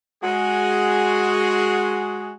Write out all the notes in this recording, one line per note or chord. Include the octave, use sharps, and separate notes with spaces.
G#3 F#4 G#4